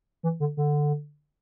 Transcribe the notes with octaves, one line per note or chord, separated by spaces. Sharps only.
E3
D3
D3